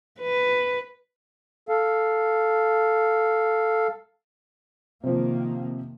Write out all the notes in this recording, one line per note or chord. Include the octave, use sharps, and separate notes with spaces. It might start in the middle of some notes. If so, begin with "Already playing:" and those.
B4
A4 F5
C3 D#3 F3 A#3